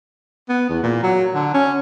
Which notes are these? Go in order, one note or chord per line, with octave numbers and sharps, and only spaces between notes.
B3
E2
A#2
F#3
D3
C#4